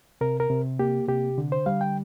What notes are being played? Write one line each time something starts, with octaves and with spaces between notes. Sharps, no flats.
C3 A#4
A#4
C3
A#3 G4
C3 G4
D3
C5
G3 F5
G5